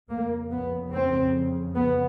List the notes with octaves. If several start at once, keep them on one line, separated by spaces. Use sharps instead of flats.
F2 C#3 A#3
B3
C4
B3